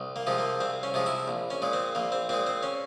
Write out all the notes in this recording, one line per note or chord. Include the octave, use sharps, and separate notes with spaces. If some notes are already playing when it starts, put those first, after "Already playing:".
Already playing: C2
A#3
C3 F3 G#3
A#3
C2 C4
C#4
C3 F3 G#3
E4
A#1
C#4
A#2 G#3
C4
A#1 A#3
C4
A#2 G#3 C4
C4
C#4